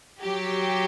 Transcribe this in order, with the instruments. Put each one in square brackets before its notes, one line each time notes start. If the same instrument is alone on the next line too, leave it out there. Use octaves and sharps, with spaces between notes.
[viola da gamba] F#3 [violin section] G4